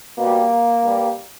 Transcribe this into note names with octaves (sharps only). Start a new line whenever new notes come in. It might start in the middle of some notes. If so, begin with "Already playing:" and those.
B2 G3 A#3
G2 G3